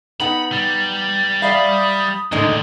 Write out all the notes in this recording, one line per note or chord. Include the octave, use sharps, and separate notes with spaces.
B3 D#4 F#5 B5
G3
D5 E5 F5 B5 D#6
D#2 A2 D3 G#3 D#4